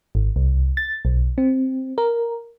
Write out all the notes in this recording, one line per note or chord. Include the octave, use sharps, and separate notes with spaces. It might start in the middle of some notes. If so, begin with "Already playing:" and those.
G#1
C2
A6
B1
C4
A#4